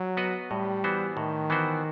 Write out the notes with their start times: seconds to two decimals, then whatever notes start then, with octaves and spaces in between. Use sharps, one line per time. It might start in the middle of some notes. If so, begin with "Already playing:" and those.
Already playing: F#3
0.17 B3 F#4 B4 D#5
0.51 A2 G3
0.84 E3 B3 F#4 C5
1.17 A2 D#3
1.50 E3 B3 F#4 C5